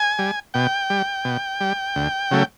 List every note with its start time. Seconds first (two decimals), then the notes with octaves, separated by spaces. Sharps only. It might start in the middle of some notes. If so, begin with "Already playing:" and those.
Already playing: G#5
0.19 G3
0.54 B2 G5
0.90 G3
1.25 B2
1.60 G3
1.96 D2
2.31 C#3 F#3 A3